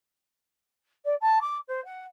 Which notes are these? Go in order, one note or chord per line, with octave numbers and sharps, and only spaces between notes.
D5
A5
D6
C5
F#5